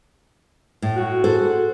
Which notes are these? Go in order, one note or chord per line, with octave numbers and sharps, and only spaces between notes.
A2
F#4
G#4 A4 C5